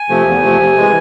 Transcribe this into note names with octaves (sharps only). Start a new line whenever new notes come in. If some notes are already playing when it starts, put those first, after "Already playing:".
Already playing: G#5
C3 F3 A3
E2
C3 F3 A3
C3
E3 G#3